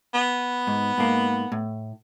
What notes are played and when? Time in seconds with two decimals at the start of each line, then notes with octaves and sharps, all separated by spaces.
0.14 B3
0.67 G#2
0.98 G#2 A#3
1.52 A2